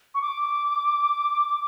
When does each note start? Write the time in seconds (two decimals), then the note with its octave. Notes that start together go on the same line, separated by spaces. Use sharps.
0.14 C#6
0.22 D6